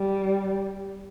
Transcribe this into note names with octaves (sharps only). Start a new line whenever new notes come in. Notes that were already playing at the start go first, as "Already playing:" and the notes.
Already playing: G3